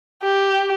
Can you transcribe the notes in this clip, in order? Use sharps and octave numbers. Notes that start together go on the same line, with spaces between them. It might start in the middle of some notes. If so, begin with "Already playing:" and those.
G4